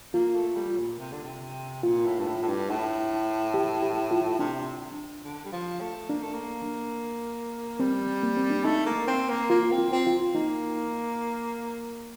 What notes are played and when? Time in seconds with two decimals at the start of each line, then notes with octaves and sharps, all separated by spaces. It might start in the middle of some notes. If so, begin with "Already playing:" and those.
0.14 A#3 F4
0.35 A3
0.55 G3
0.77 A#2
0.99 C3
1.12 D3
1.24 C3
1.83 A#2 F4
2.05 A2
2.19 G2
2.26 A2
2.42 A2
2.48 G2
2.69 A2
3.54 G4
3.83 G4
4.11 F4
4.39 C3 D4
5.24 D3
5.45 G3
5.52 F3
5.80 A3
6.09 A#3 D4
6.22 A3
6.34 A#3
7.80 G3 C4
8.23 A#3
8.37 C4
8.50 D4
8.64 A3 D#4
8.86 A#3
9.07 C4
9.29 A#3
9.50 A#3 F4
9.72 C4
9.78 F4
9.92 C4
10.07 F4
10.35 A#3 D#4